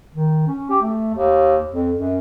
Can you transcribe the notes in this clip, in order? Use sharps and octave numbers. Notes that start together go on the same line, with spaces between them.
D#3
C#4
G4
A3
D#2
F2
F#2